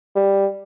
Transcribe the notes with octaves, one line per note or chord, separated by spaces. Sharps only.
G3